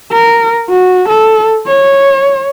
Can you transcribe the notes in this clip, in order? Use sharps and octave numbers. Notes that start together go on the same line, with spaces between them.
A#4
F#4
A4
C#5